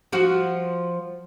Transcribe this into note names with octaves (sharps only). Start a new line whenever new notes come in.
F3 F#4